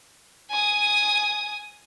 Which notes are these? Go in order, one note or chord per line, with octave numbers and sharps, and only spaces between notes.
G#5 D#6